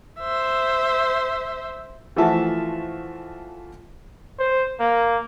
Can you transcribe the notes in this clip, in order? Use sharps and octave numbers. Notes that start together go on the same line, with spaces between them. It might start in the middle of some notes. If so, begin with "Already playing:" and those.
C5 E5
E3 F3 A3 F#4 E5 A5
C5
A#3